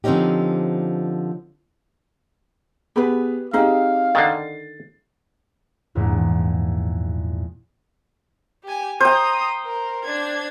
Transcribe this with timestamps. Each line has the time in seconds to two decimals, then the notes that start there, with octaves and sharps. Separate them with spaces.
0.04 D3 F3 C4 C#4 D#4 G4
2.96 B3 G4 G#4 B4 B5
3.53 C4 D#4 G4 G#4 F5
4.15 D3 D#3 A6 C7
5.95 A#1 E2 G#2 A#3
8.64 G4 G#5
9.00 C5 G5 A#5 D#6
9.66 A#4
10.04 D4 G#6